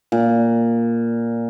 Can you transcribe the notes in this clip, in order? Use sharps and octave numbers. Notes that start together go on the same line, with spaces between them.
A#2